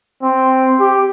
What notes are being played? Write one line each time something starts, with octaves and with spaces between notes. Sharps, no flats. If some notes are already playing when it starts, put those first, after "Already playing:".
C4
G4